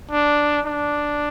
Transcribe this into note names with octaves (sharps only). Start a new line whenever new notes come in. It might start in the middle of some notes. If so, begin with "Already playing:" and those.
D4
D4